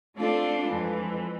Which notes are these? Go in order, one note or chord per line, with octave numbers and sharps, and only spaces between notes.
A3 C4 D4 F4 A4
F2 E3 G#3